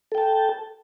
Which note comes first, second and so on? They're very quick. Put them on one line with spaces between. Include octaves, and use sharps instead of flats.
A4 G5 A5